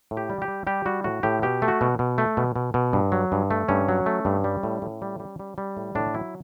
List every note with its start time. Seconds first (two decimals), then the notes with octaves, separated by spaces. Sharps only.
0.11 A2
0.17 G4
0.30 G3
0.42 G4
0.48 G3
0.67 G3 G4
0.86 G3 F#4
1.04 A2 F#4
1.23 A2 G4
1.42 B2 G4
1.62 A3
1.68 F#4
1.81 B2
1.99 B2
2.18 A3
2.37 B2
2.56 B2
2.74 B2
2.93 G2
3.12 F#3
3.32 G2
3.51 A3
3.68 G2 C#4
3.89 F#3
4.06 A3
4.25 G2
4.44 G3
4.63 A2
4.82 A2
5.02 G3
5.20 G3
5.39 G3
5.58 G3
5.77 A2
5.95 A2 D4
6.14 F#3 E4